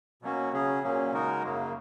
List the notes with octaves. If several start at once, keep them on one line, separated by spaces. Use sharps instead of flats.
B2 F#3 A#3 C#4 F#4
C#3 F#3 C#4 G#4
A#2 F#3 A#3 C#4
C#3 G#3 D#4 F#4 A#4
F#2 C#3 F#3 A#3